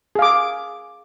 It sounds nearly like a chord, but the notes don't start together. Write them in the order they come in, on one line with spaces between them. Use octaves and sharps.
G#4 F5 D6